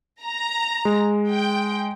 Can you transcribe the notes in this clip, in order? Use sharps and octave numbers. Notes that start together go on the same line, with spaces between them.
A#5
G#3
G5